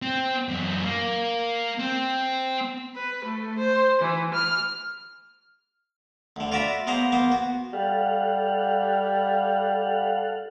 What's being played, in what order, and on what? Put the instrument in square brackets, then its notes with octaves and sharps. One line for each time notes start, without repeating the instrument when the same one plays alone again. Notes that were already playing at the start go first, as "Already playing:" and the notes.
[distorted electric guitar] C4
F#2 E3
A#3
C4
[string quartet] B4
A3
C5
E3
F6
[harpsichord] D2 D3
F4 F#4 D5 E5 A#5 B5
A#3 B3 G#4 A#4 C5 A#5
A#3 B3 C5
F#4
[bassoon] G3 [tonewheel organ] A4 F5 F#5